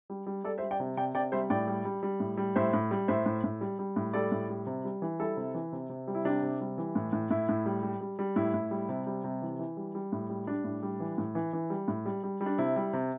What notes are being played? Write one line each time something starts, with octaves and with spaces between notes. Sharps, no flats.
G3
G3
G3 A4 D5
C5 E5
G3
D5 G5
C3
C3 D5 G5
C3 D5 G5
G3 C5 E5
A2 D5 G5
G3
G3
G3
A2
G3
A2 C5 E5
A2
G3
A2 C5 E5
A2
A2
G3
G3
A2
G3 A4 D5
A2
G3
C3
G3
E3
G3 E4 A4
C3
E3
C3
C3
G3
E4
C3 D4 G4
C3
G3
E3
A2
A2
A2 E4
A2
G3
G3
G3
G3
A2 E4
A2
G3
C3
G3
C3
E3
E3
G3
G3
A2
G3
G3 D4
A2
G3
E3
A2
E3
E3
G3
A2
G3
G3
G3
D4
C3 E4
G3
C3